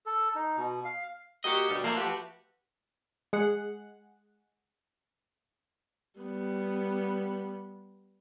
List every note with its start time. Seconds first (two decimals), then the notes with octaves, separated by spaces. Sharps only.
0.06 A4
0.35 D#4
0.57 B2
0.85 F5
1.44 A#3 F#4 G4 D#5
1.68 D2 B2 G3
1.84 F3 A3 A#3
1.97 F#4 G4 B4
3.33 G#3 G#4 F#5
6.20 G3 B3